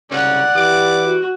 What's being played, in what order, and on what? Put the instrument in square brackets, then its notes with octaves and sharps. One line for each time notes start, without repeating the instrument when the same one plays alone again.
[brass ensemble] C2 G#2 C#3 [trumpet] C#4 [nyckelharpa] D5 F#5
[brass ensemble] E3 E4 G4 [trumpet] D6
[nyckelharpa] F#4